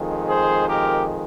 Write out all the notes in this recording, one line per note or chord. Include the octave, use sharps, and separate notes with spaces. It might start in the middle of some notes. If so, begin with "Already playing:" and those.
Already playing: F2 D#3 G#3
G#4 C5
G4 A#4